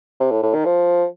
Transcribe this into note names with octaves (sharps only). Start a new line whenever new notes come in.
C3
A2
A2
D#3
F3